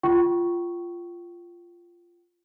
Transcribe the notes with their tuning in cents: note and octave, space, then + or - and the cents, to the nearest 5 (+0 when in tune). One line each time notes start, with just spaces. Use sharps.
F4 -10 G5 -30 C#6 +0